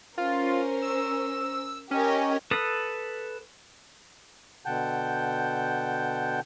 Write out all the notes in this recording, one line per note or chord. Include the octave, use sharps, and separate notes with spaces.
C#4 F4 A#4 C5
E6
C#4 G4 A#4 D#5
A4 B4 D#6
B2 D3 F#5 G5 A5 G6